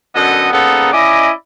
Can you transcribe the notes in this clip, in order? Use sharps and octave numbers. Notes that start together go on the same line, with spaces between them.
F#2 D3 B3 A4 D#5
C#3 A#3 B3 D#4 A4
C#4 E4 D5 D#5